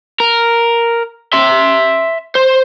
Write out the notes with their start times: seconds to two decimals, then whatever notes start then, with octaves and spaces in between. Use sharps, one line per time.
0.20 A#4
1.33 E5 C6
2.35 C5